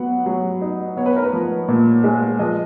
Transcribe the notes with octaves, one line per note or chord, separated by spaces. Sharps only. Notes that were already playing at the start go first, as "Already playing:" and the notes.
Already playing: F#3 B3 F#5
F#3
D#4
B3 C#5
B4
A#4
B4
F3
A#2
G#3
F3 D#5